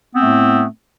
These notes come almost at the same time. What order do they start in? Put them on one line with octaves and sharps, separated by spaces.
B3 C4 A3 A2